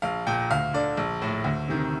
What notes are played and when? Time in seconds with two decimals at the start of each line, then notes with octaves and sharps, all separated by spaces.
0.02 A#1 F5
0.27 A#2 G5
0.51 D2 F5
0.74 D3 D5
0.97 A#1
1.22 A2
1.44 D2
1.68 C3 D#3